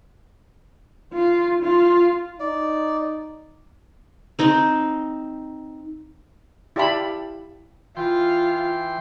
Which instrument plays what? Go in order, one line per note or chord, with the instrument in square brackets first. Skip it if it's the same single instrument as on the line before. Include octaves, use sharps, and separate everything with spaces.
[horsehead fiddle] F4
F4
[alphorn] D#4 [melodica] D5
[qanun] C4 D#4 C5
[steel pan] E4 G4 D5 F5 A5 B5
[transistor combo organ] E3 G5 C6 [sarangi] F4